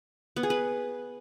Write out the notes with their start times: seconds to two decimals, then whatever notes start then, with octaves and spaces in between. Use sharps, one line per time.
0.36 B3
0.43 G#4
0.50 B4